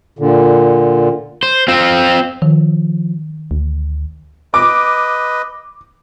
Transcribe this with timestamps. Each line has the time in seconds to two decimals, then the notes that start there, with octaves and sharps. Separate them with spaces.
0.19 A#2 D3
1.43 C5
1.68 C4 F4
2.42 D#3 F3
3.51 D2
4.54 B4 D#5 D6